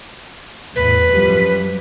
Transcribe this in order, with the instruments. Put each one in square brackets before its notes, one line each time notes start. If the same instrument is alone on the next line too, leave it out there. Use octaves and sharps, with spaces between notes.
[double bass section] E2 A2 [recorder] B4
[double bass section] F#2 F3 G3